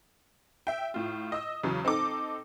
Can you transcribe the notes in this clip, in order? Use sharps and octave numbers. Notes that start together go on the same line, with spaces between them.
E5 G5
A2 F4
D#5 E6
E2 C#3 F#3
C4 D#4 A4 D6